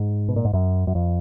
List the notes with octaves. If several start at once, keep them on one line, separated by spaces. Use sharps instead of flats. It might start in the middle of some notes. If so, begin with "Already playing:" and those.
Already playing: G#2
B2
A#2
G#2
F#2
F#2
F2